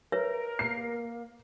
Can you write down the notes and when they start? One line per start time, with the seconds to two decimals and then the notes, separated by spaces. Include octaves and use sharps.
0.12 A#4 B4 C#5 E5
0.59 A#3 C7